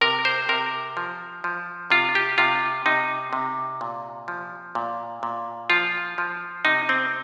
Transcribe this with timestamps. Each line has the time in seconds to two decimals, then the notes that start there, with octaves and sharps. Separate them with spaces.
0.01 C3 A#4
0.25 C5
0.49 C3 A#4
0.97 F3
1.44 F3
1.90 C3 F4
2.15 G4
2.38 C3 F4
2.86 C3 D#4
3.33 C3
3.81 A#2
4.28 F3
4.75 A#2
5.23 A#2
5.70 F3 F4
6.18 F3
6.65 C3 D#4
6.89 C4